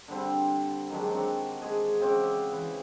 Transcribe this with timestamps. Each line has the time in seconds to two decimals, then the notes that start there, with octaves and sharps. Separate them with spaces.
0.08 D3 G3 C4 C6
0.90 D#3 F#3 G#3 D4
1.10 C4 F#4
1.62 G#3 G#4 G#5
2.00 C#3 C4 F#4 D6
2.52 E3